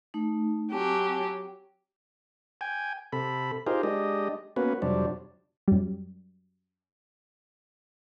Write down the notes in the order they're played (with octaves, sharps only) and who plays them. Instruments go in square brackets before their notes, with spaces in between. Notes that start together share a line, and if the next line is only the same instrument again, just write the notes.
[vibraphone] A3 D#4
[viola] F#3 G4 [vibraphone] C4 G#5 A5
[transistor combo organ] G5 G#5
C3 A4 B5
D#4 F4 G4 G#4 A#4 C5
G#3 D4 G4 D#5
A#3 B3 C#4 F#4 B4
F2 C3 F#3 G3 D4
[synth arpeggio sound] F#2 G3